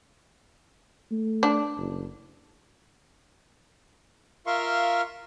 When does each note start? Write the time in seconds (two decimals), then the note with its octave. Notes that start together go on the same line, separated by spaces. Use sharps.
1.11 A3
1.43 D4
1.77 F#1
4.47 F4 A#4 E5 F5 C6 C#6